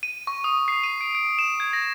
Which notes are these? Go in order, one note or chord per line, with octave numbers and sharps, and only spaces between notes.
D#7
C#6
D#6
C7
D#7
D7
D7
E7
G#6
A#6